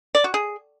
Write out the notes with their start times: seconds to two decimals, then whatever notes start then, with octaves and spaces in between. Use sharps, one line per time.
0.15 D5
0.24 F#4
0.34 G#4